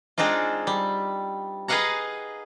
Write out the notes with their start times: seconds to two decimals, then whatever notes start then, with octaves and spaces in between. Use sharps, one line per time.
0.18 G#3 C4 D4 D#4 F4
0.67 G3
1.68 G#4 B4 D#5 F5 F#5 A#5